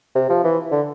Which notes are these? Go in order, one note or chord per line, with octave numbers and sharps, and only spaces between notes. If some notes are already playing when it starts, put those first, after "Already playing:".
C3
F3
E3
D3